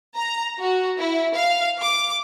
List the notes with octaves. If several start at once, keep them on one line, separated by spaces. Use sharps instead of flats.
A#5
F#4
E4
F5
D6